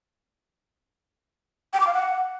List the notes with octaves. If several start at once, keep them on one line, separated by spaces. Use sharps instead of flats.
G5
D6
F5
F#5